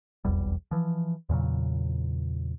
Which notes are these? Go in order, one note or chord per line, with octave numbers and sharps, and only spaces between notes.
F1 B1 E2 G3
E3 F3
E2 A#2 C#3 F#3